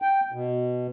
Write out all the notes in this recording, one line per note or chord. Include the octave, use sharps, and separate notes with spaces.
G5
B2